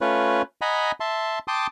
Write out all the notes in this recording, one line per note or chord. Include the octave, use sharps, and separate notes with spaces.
A3 C#4 F4 B4 C#5
D#5 F#5 G#5 A#5 B5
E5 A5 C6
G5 A5 C6 D6 D#6